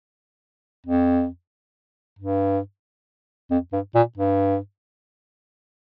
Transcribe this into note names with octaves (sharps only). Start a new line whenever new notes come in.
F2
G2
F2
G2
A#2
G2